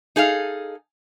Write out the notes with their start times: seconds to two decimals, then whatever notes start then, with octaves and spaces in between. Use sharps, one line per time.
0.16 D#4 G#4 A4 F5